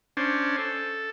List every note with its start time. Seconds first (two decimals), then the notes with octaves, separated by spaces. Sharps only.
0.17 C#4 D4 C5
0.58 A4